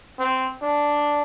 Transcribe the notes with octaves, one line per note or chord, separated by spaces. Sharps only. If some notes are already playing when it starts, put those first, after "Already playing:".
C4
D4